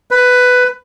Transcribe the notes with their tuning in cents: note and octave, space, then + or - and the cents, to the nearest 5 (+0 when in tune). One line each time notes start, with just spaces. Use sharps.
B4 +10